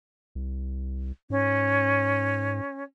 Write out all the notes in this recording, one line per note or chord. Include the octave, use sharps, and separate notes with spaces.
C2
G#2 C#4